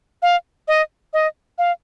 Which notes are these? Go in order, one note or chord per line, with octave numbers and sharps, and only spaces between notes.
F5
D#5
D#5
F5